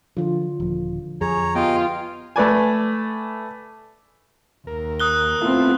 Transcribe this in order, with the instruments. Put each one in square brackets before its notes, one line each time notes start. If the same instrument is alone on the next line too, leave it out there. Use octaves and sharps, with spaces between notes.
[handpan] D3 F4 [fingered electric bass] F3
[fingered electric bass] D#1 F3
[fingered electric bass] F2 [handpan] G#4 [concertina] C#5 A#5
[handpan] B3 G4 [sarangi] F4 [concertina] D#5 G5
[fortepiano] A3 B4 D5 G#5
[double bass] D#2 [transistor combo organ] A#4
[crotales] D#6 F#6 G7
[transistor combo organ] A3 E4 F4 [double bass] B3 C4